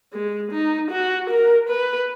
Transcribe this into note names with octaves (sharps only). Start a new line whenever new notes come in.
G#3
D#4
F#4
A#4
B4